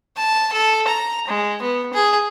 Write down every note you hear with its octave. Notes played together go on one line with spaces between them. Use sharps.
A5
A4
A#5
G#3
B3
G#4